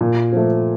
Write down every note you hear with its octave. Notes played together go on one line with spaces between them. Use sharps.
A#2
F3 A3